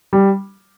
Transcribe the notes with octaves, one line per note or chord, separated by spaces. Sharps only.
G3